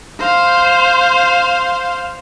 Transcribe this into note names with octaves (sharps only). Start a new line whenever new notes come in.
C5 F5